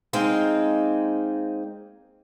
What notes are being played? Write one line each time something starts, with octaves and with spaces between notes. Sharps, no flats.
G#3 A#3 C4 D#4